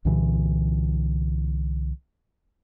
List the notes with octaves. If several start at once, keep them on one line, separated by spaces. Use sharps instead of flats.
C2 A#2 D3 E3